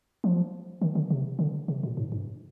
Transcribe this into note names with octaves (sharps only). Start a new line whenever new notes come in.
F3
D#3
D3
C3
D3
C3
A#2
G#2
G2